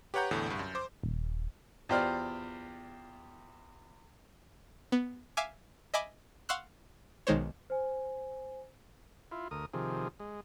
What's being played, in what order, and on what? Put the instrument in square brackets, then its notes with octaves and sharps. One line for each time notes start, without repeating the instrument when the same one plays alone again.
[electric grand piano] G4 B4 C#5 F#5 A#5 G6
E2 A2 D3
C2 G2
F#2
C5 D6
[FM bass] D#1
[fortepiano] E2 F4 G4 C5 D5 F6
[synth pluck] B3
E5 F5 G#5 D6
D#5 E5 G#5 B5 D6
F5 F#5 C6 C#6 E6 F#6
B1 D#3 G#3 C5 C#5
[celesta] C5 G#5
[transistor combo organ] E4 F4
D2 A#4 D#6
C3 D#3 F3 G#4
G#3